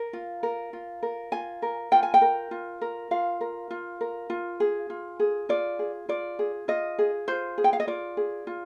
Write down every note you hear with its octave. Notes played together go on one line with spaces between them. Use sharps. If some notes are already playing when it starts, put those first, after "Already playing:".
Already playing: A#4
F4
A#4
F4
A#4
F4 G#5
A#4
F4 G5
G#5
G5
A#4
F4
A#4
F4 F5
A#4
F4
A#4
F4
G#4
F4
G#4
F4 D5
G#4
F4 D5
G#4
F4 D#5
G#4
F4 C5
G#4
G5
F5
D#5
F4 D5
G#4
F4